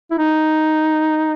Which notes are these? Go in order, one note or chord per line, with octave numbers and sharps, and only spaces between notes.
E4
D#4